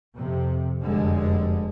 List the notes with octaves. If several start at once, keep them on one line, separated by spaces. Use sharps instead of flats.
F2 C3
F1 F#2 D3 G3 G#3